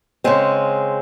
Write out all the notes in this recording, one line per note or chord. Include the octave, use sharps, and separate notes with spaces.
C#3 G#3 C4